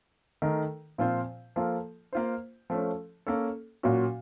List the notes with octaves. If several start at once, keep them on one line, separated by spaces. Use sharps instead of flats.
D#3 A3 D#4 A#4
A#2 F3 C4 F4 C5
F3 A#3 F4 A4
A#3 F4 C5
F3 A3 C#4
A#3 C#4 A4 C#5
A#2 F#3 A#3 C#4 F#4